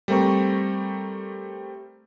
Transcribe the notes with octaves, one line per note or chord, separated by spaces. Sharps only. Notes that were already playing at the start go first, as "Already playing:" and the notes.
G3 A3 C4 A#4 A#5 C#6